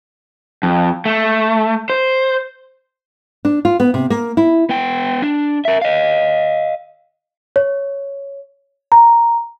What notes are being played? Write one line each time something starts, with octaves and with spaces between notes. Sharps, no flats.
F2
A3
C5
D4
F4
B3
C3
A#3
E4
B3 G5
D4
A#4 E5
D#5 F5
C#5
A#5